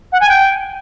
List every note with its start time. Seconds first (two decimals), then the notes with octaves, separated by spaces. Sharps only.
0.12 F#5
0.21 G#5
0.29 G5